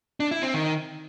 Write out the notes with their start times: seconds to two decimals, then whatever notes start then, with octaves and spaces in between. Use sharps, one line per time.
0.20 D4
0.31 E4
0.43 C4
0.54 D#3